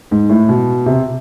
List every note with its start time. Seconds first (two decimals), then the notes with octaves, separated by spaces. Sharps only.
0.11 G#2
0.29 A2
0.49 B2
0.86 C3